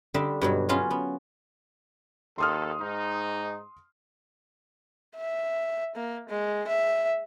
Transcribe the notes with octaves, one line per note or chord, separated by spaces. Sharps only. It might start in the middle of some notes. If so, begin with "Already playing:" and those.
D3 G3 D4 D#5 E5
G2 B2 F#3
F#3 B3 C#4 F4
B3
D#2 A4 C6 D#6 F6
G#2 D#4
E5
A#3
G#3
E5